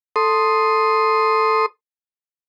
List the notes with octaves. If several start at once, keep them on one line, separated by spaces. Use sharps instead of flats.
A4 C6 D#6